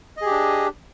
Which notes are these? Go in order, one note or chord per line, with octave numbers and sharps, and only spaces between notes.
D4 G4 G#4 D#5